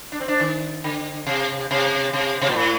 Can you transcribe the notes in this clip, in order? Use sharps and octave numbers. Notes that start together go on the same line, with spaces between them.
D4
C4
D4
D#3
D3
C3
C3
C3
C3
A#2
A2